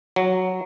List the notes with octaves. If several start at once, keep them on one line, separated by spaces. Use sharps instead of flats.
F#3